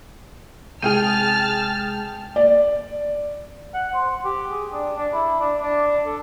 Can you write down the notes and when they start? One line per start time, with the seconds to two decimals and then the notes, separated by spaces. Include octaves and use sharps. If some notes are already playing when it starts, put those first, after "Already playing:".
0.82 C3 G#3 G#4 G5 A5 F6 G6 D#7
2.36 D5
3.74 F#5
3.94 C5
4.25 G4
4.50 G#4
4.73 D4
4.96 D4
5.13 E4
5.40 D4
5.62 D4
6.06 A4